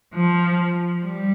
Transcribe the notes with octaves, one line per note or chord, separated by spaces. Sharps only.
F3
G3